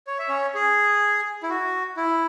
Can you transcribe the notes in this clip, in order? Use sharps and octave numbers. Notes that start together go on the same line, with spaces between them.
C#5
E5
C#4 C#5
G#4
E4
F#4
E4